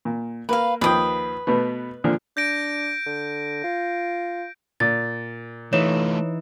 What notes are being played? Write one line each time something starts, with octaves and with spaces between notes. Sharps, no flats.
A#2
A#3 B4 F5
D#2 F3 B4 G5 D#6
B2 A3 B3
A#2 D3 F3
D4 G6 A#6 D7
D3
F4
A#2 A6
E3 A3 D#4 F4 C#5 E7